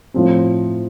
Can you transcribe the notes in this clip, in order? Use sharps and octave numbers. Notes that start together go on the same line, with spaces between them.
A2 F3 C4